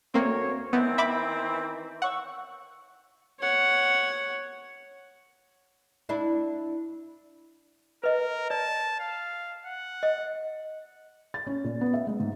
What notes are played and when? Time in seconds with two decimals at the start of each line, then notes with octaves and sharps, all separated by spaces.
0.14 D2 A#3 C4 C#5
0.73 D#3 E3 B3 C4
0.98 E5 B5 D6
2.02 F#5 C#6 E6
3.40 C#5 F#5
6.09 D4 E4
8.04 A#4 B4 D#5
8.50 D5 A5
9.00 F5
9.66 F#5
10.03 D#5
11.34 A6
11.47 C#4
11.64 A#2
11.81 B3
11.94 E5
12.07 G#3
12.20 G#2